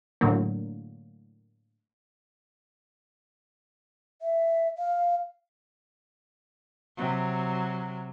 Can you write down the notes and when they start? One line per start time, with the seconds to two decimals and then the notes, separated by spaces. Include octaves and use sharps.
0.21 A2 D3 F#3 A#3
4.22 E5
4.78 F5
6.97 C3 F#3